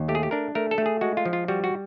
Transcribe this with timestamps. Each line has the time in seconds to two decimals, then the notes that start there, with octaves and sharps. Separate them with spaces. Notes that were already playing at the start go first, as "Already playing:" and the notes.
Already playing: D#2
0.08 A3 G4
0.15 G#4
0.23 G4
0.31 D4 A#4
0.55 A3 A#4
0.71 A4
0.78 A3
0.86 G#4
1.01 G#3 F#4
1.17 F4
1.26 F3
1.33 F4
1.48 G3 F#4
1.64 F#4